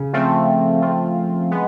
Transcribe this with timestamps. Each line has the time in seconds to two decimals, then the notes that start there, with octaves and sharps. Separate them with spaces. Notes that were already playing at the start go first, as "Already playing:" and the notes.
Already playing: C#3
0.13 F3 A3 C4 F4
0.81 F3 A3 C4 F4
1.51 G#3 B3